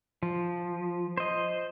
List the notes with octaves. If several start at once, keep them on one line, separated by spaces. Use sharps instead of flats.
F3
C5 D#5